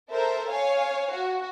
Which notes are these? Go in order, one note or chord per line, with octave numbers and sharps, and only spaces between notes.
A4 A#4 C5 E5
C#5 F5 G#5
F#4